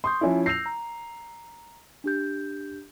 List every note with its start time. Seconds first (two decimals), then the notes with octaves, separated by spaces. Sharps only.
0.04 C6 C#6 D#6 G6
0.21 F3 C#4 E4 E5 G#5
0.46 E6 G6 A#6 C7 F7
0.66 A#5
2.04 D4 G4 G6